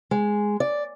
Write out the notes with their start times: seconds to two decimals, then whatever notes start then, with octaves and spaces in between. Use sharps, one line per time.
0.11 G#3
0.60 D5